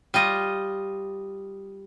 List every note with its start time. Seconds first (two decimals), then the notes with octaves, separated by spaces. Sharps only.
0.14 G3 F4 D#5